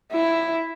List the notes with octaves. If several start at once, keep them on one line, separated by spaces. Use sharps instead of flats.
E4